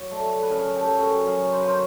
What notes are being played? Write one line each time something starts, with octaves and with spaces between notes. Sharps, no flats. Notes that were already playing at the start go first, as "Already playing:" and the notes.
Already playing: F#3
A3 D5 E5
B4
C#3 G#4 A#4
A#4
G4 A4
F#3
G#4 A#4
F#3 G#4 A#4
C5
B4
F#3 A#4 C5